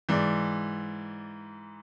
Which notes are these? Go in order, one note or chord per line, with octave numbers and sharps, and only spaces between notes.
G#2 E3 D5